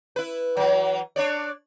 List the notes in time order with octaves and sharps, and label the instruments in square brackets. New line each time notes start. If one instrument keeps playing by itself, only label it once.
[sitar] E4 B4
E3 F#3
D4 C#5 D5